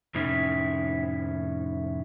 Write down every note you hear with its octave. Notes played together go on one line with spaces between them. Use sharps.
F2 A2 C3 C#4 D#4 E4